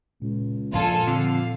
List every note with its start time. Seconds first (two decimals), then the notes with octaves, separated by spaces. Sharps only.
0.22 C#2 A#2
0.73 A#1 F#2 A#2 F4 A4 G#5
1.07 F2 D3 F5